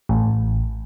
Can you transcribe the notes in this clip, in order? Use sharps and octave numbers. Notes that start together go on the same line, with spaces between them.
A1